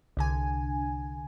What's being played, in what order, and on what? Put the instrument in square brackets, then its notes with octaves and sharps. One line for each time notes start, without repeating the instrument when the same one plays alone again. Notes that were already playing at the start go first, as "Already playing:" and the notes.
[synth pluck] C2 D3 G#5